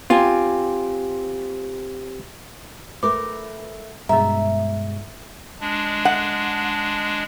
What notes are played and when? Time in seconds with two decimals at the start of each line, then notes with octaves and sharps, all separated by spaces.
0.10 C4 F4 G4 G#5
3.03 A3 A#4 B4 D6
4.09 G2 B2 G#3 E5 A#5
5.61 G#3 D4
6.05 F#5